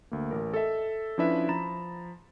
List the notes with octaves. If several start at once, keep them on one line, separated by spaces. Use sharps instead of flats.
D2 A#3
A1 A#4
A4 D#5 E5 A5
F3 C#4 D4 E4 B4 E5
F3 A#5 B5 A6 E7